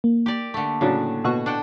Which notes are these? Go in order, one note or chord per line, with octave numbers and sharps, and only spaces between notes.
A#3
G4 D5
D3 A3
A2 C#3 F#3 D4
B2 F#4 C#6
D4 F#5 G5